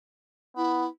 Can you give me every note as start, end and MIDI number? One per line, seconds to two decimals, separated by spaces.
0.57 0.86 59
0.57 0.87 64